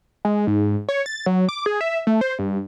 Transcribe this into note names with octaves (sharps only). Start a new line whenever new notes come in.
G#3
G#2
C#5
A6
F#3
D6
G#4
E5
A3
C5
G2